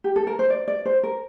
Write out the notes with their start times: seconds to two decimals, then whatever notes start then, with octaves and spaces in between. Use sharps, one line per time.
0.04 G4
0.16 A4
0.27 A#4
0.39 C5
0.50 D5
0.68 D5
0.86 C5
1.03 A#4